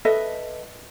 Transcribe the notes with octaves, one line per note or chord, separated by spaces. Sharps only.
A4 B4 D#5 E5